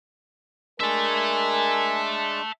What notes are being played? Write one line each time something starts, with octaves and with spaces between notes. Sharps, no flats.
G#3 D4 A#4 E5 G#5 A5